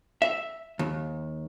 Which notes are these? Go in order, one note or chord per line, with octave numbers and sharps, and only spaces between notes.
E5
D#2